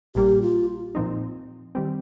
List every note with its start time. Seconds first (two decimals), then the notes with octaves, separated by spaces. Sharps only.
0.15 A#1 A#2 G3 A#3 G4
0.42 F4
0.95 A#2 F3 C4 D#4
1.75 D#3 G3 C4